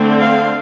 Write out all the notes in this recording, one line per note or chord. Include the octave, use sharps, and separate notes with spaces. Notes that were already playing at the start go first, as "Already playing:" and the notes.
Already playing: D3 A3 C4
F5